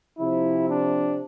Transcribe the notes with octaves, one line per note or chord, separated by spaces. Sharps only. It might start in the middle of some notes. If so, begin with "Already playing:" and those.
C3 F3 C4 E4
D4